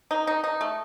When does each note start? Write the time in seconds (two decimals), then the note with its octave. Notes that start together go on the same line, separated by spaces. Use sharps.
0.11 D#4
0.27 D#4
0.44 D#4
0.61 A3